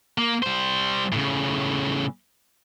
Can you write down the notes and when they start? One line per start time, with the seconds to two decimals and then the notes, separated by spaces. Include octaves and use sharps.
0.18 A#3
0.43 G3 C5
1.12 A2 C#3